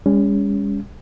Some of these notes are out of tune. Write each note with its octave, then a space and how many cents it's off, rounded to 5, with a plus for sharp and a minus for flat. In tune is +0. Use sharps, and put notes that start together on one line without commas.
G#3 -45 C#4 +20